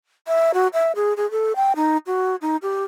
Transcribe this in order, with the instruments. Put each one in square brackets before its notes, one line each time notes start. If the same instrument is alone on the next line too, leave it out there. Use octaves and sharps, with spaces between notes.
[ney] E5
F#4
E5
G#4
G#4
A4
G5
D#4
F#4
D#4
G4